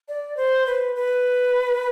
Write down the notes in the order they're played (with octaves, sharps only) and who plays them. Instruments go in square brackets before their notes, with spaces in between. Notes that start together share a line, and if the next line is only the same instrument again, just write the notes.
[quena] D5
C5
B4
B4